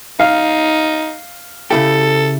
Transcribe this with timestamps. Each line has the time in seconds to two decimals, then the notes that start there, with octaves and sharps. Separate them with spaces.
0.20 D#4 F5
1.71 C#3 E4 G4 A4